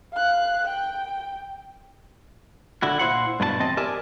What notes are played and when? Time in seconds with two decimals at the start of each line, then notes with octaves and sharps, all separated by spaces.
0.13 F5 F#6
0.65 G5
2.82 D3 E4 F#4
2.99 A#2 E4 C5 F#5
3.40 G2 B2 B4 A5
3.60 E2 C4 D#5 A5
3.77 G4 A#4 D5 E5 G#5 A5